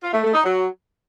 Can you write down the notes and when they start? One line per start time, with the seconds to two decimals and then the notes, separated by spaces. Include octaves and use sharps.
0.03 F4
0.13 A3
0.23 A3
0.34 D#4
0.44 F#3